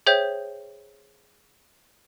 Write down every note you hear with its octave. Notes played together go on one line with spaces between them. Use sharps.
G#4 C5 C#5 E5 G5 G6